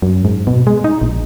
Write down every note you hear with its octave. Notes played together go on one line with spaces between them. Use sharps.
F#2
G#2
B2
G#3
D#4
A#1